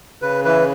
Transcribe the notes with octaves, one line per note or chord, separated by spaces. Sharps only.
C#3 B4
E3 B4